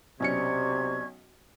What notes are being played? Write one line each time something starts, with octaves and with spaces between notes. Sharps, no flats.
B1 C3 C#4 D5 C#6 G#6 C#7